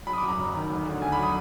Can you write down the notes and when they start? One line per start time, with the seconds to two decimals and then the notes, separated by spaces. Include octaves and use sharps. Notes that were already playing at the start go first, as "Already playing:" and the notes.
0.07 F#3 B5
0.13 D#6
0.17 D6
0.23 F#2
0.28 A#5
0.38 F#1
0.54 D#3
0.70 D2
0.86 D3
1.02 D2 G#5
1.12 B5
1.17 F#3
1.23 D#6